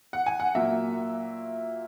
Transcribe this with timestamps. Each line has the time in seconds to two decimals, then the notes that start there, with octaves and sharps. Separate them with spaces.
0.13 F#5
0.26 G#5
0.40 F#5
0.55 A#2 F#3 A#3 E5